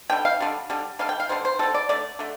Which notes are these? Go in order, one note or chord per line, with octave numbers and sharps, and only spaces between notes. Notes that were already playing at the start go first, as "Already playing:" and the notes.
D3 G3 G5
F5
D3 G3
D3 G3
D3 G3 F5
G5
F5
D3 G3 C5
C5
D3 G3 A4
D5
D3 A3 D5
D3 A3